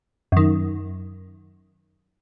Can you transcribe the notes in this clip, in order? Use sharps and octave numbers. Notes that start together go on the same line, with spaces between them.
F#2 D#3